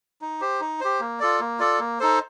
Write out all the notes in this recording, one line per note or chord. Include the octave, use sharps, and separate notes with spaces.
D#4
G4 C5
D#4
G4 C5
A#3
F4 A4 D5
A#3
F4 A4 D5
A#3
D#4 A4 C5